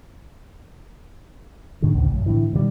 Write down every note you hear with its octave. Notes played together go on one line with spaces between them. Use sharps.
A2 D3 D#3
A1 D2 C#3
B1 F#2
A2 D3 E3
B2 D#3 E3 G3